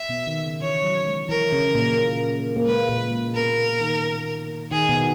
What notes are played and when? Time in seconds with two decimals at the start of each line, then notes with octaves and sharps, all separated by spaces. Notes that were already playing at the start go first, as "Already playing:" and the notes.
Already playing: E5
0.09 B2 B3
0.27 D#3
0.44 C#3
0.61 E3 C#5
0.83 F#3
1.06 G#3
1.29 E3 E4 A#4
1.52 C#3 C#4
1.75 A#2 A#3
2.56 A#3
2.66 G#3 B4
2.89 A#2 A#3
3.11 G#3
3.34 B2 B3 A#4
3.80 D#3 D#4
4.71 D#3 D#4 G#4
4.89 B2 B3